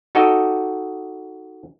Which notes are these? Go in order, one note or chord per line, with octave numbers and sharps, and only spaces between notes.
D#4 F#4 G4 A4 D#5